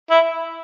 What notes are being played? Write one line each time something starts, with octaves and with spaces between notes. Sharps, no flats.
E4